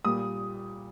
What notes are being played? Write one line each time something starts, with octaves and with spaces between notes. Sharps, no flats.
A#2 G3 D#6